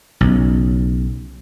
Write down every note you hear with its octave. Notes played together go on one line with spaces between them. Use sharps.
B1 C#3